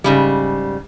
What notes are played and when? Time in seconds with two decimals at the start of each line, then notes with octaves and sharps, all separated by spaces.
0.04 G#2 C#3 G3